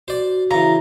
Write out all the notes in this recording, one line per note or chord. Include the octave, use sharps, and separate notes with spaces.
F#4 C5 D5
C#3 E3 A#5